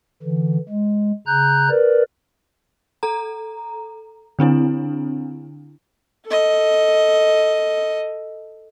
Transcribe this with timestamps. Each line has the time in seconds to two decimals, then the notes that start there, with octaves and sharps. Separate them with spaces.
0.23 D3 E3
0.69 G#3
1.27 C#3 A#5 F#6 G6
1.70 A#4 B4 D5
3.03 A4 A#5
4.39 D3 C4 D4 E4
6.26 A4 D#5